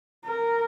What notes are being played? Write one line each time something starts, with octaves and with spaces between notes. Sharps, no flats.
A#4